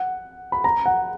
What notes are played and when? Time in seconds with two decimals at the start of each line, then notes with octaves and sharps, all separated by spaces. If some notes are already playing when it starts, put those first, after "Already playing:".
Already playing: F#5
0.52 B5
0.64 A#5
0.86 F#5